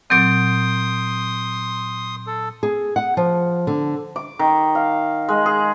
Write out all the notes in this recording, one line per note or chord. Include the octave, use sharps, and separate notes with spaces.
A#2 F#3 C4 C6 D#6 G6 D7
A4
G#4
F#5
F3
D3
D6
D#3
F5
G#3
G#4